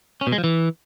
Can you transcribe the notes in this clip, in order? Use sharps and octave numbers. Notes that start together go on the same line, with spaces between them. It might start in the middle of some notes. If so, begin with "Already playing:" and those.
C#4
B2
G#3
F3
E3